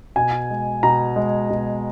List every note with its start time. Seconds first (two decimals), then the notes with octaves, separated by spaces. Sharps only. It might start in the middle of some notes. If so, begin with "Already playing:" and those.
0.16 B2 G#5
0.50 G#3
0.83 B2 A#5
1.16 G#3
1.50 B2